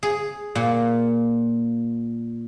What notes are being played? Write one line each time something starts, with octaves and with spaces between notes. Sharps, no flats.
G#4
A#2